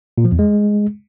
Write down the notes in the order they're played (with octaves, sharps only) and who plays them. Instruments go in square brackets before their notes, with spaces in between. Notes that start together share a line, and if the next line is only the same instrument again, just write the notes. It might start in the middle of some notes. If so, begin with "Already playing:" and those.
[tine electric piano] A#2
F3
E2
G#3